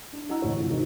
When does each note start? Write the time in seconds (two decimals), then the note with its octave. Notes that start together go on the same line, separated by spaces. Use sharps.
0.13 D4
0.29 E4 D#5 F#5 A#5 E6
0.42 A1 D2 E3 C#5
0.57 C3 F3
0.70 G#2 D#3 D#4 F4 F#4